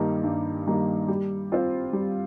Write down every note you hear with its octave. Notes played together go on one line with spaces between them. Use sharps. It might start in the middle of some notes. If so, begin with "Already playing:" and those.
Already playing: G2 D#3 G3 A#3
G2
D#3 G3 A#3
G3
C4 F4 C5
G3